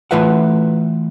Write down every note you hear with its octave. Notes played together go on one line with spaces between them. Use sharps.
E3 A3 F4 B4 E5 F#5